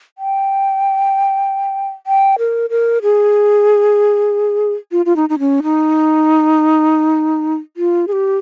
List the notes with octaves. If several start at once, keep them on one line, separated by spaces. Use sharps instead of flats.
G5
G5
A#4
A#4
G#4
F4
F4
D#4
D#4
C#4
D#4
F4
G#4
G4